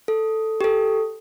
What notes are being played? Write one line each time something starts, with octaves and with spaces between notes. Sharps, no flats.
A4
G4
A4